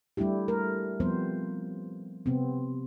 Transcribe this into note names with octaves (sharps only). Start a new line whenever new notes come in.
G3 A3 D4 E4 G4
A3 A#4
F3 G3 B3 C4 C5
C3 B3 C4